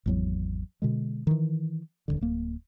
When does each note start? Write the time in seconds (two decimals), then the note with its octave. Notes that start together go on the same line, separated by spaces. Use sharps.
0.06 G#1 E2 F#3
0.82 B2 D3 G#3
1.27 D#3 E3
2.08 D#1 A#1 D3
2.21 D1 A#3